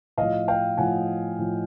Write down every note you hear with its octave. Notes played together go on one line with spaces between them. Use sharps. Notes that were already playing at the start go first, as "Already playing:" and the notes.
A2 F3 D#5 F5
F5 G5
A2 F3 F#5 G#5
A2 F3